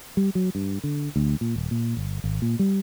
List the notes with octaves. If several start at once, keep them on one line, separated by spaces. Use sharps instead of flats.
G3
F#3
G2
D3
D2
A#2
D#1
A#2
G1
G#1
A#2
G3